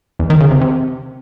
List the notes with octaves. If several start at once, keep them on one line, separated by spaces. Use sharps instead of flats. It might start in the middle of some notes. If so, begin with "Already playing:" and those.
E2
D#3
C#3
C3
C3